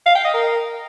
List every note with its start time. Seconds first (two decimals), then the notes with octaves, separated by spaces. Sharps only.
0.06 F5
0.15 G5
0.25 D#5
0.34 A#4